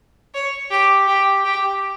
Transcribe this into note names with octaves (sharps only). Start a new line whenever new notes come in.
C#5
G4
G4
G4